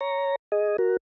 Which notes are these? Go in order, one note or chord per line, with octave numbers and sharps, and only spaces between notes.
C#5 A#5
G#4 D#5
F#4 A#4